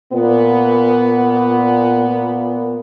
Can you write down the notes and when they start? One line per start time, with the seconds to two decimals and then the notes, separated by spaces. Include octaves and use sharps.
0.13 A#2 B3